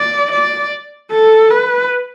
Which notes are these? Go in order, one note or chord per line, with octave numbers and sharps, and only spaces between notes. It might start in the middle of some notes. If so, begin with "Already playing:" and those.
Already playing: D5
D5
A4
B4